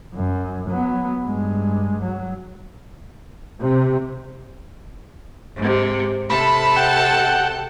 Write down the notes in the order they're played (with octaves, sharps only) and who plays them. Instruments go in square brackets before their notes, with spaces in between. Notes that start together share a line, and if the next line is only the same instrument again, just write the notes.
[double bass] F#2
F#3 B3
G2 G#3
F#3
[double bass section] C3
[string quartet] G#2 C3
[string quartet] C3 A4 A5 [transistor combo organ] B5
[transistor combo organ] F#5 G5